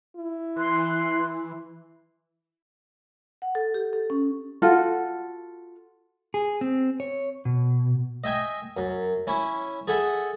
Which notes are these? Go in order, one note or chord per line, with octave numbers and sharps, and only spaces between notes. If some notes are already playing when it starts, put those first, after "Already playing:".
E4
E3 C6 F#6
F#5
A4
G4
A4
C#4
F4 F#4 A4 F#5
G#4
C4
C#5
B2
D#5 E5 G5 G#5
F#2
C#4 E4
G#4 A4 E5 F#5